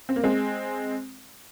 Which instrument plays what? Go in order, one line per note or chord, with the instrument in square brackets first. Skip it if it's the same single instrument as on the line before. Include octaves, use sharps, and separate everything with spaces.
[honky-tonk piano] C4
A#3
G#3 C4